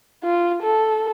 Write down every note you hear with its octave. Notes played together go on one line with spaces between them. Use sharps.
F4
A4